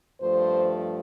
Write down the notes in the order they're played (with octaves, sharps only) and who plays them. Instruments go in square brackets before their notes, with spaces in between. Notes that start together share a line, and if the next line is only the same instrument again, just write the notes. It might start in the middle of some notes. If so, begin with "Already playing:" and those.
[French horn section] G2 F3 A3 C5